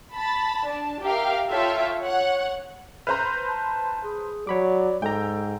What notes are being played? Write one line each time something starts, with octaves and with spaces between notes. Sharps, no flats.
A5 B5 A6
D4 A5
G4 A#4 E5 F5 G5
F4 A4 C#5 E5 F5 G5
C#5 F#5
B4 C5 A#5 F6
A5
G#4
F#3 C#5 D5 B5 D6
G#2 G#3 A4 G5 A#5